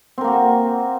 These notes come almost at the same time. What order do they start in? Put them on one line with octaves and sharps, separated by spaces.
C4 A#4 A#3 F#4